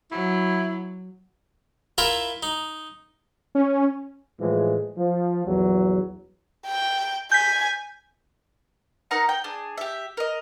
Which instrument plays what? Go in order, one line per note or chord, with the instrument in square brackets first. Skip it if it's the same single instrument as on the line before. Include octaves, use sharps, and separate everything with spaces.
[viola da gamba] F#3 [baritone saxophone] E4
[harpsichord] E4 F4 A#4 E5 B5
D#4
[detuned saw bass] C#4
[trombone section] A2 E3 F3 G#3
F3
A#1 E2 F#3
[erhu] G5
[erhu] G#5 [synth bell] G6 B6
[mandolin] D#4 A#4 F#5 A#5
G5
D4 G#4
G4 E5
A#4 D#5